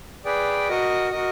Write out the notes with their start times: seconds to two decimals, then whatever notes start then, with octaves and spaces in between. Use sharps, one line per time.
0.25 G#4 B4 D5 G5
0.69 F#4 A#4 D#5
1.11 F#4 A#4 D#5